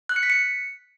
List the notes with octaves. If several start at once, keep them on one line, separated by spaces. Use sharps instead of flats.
F#6
C#7
B6
C#7